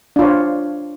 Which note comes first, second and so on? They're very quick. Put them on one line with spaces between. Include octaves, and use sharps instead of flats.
D4 F4 C#5 C5